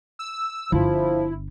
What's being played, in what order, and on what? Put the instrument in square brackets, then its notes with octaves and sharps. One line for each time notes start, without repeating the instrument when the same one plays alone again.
[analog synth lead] E6
[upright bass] G1 [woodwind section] F3 [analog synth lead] E4